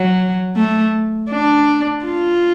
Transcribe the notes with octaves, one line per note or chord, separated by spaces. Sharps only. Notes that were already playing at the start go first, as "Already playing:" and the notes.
Already playing: F#3
A3
D4
F4